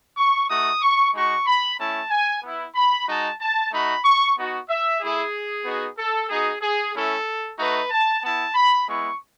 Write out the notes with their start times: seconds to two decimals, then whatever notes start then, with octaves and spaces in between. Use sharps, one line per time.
0.17 C#6
0.49 A3 D#4 F#4 D#6
0.82 C#6
1.14 G#3 D#4 F#4 C#6
1.46 B5
1.78 A3 C#4 E4 A5
2.11 G#5
2.43 B3 E4
2.75 B5
3.07 G#3 D#4 F#4 A5
3.40 A5
3.72 A3 D#4 F#4 B5
4.04 C#6
4.36 B3 D#4 F#4
4.68 E5
5.01 A3 E4 G#4
5.65 B3 D#4 F#4
5.98 A4
6.29 B3 D#4 F#4 G#4
6.61 G#4
6.94 A3 C#4 E4 A4
7.58 A3 D#4 F#4 B4
7.91 A5
8.23 B3 E4 A5
8.55 B5
8.87 G#3 B3 E4 C#6